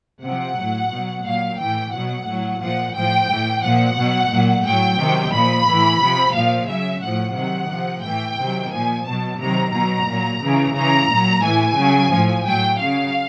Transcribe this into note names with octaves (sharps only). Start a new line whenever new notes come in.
C3 F3 F#5
A2 F#3
B2 F#3
A#2 F#3 F5
A2 E3 G5
B2 F#3 F#5
A2 F#3
A#2 F3 F#5
A2 F3 G5
A2 E3
A#2 F3 F#5
B2 F#3
A#2 F#3
A2 F#3 G5
C3 D#3 F#3
A#2 F3 B5
A2 E3
C3 F3
A#2 F3 F5
C#3 F#3 E5
A2 F3 F#5
C3 D#3 F#3 F#5
C3 F3
A2 E3 G5
C3 D#3 F#3
A#2 F3 G#5
B2 F#3 A5
C3 D#3 F#3 A#5
B2 F#3 A#5
A#2 F#3
C#3 E3
C#3 E3 A#5
A#2 F#3
A2 E3 G#5
C#3 F#3
A2 F3
A2 F#3 G5
C#3 F#3 F5